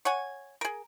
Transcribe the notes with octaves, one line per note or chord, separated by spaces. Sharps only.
C#5 F#5 G#5
G#4 A#4